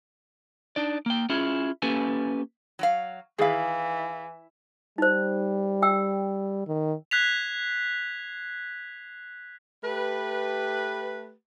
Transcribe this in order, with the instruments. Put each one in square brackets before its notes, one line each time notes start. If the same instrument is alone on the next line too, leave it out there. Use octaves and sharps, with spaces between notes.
[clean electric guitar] D4 D#4 D5
A#3 G5
C#4 E4 F4 G#4
A#3 C#4 G4 A4 B4 G#5
[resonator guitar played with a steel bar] F#3 F#4 F5
[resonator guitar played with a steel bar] D#3 E4 [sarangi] E3 [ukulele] G#4 F5
[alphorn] G3 [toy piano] D#4 C5
[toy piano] G5 E6
[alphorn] D#3
[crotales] F#6 G#6 B6 C7 F7
[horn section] A3 G4 B4